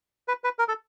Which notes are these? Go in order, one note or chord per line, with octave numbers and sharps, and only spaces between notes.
B4
B4
A#4
A4